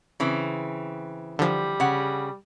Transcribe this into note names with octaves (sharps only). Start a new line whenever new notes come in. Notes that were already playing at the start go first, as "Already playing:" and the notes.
C#3 E3 C4
D3 F3 G3
C#3 F#5